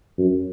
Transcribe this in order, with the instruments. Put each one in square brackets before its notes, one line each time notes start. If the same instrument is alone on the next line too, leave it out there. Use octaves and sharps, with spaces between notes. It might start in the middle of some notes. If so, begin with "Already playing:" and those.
[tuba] F#2